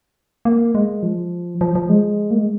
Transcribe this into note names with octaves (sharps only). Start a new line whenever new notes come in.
A#3
G#3
F3
F3
F3
G#3
A#3
G#3